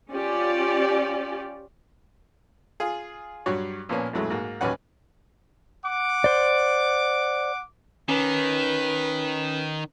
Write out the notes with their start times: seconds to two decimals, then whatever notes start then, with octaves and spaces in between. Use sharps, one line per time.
0.12 C#4 F4 G4 D5
2.80 F4 G#4
3.46 G2 F#3 G3 F#4 C#5
3.89 A#2 F3 A#3 B3 C#4
4.13 A#1 F2 E3 F#3 G#3 A3
4.30 G#2 A#3 F#4
4.61 A1 D#2 F#3 C#4 B4 F#5
5.85 F#5 D6
6.24 C5 D5
8.09 D#3 C#4 B4 B6